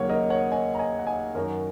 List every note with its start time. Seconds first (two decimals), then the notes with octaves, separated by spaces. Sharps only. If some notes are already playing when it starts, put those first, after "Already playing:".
Already playing: D#2 C#3 F#3 A#3 C#5 F#5
0.09 A#4 D#5
0.30 C#5 F#5
0.51 D#5 G#5
0.75 A#5
0.79 D#5 G#5
0.99 F#5
1.07 D#5 G#5
1.35 F#2 D#3 F#3 F#4 A#4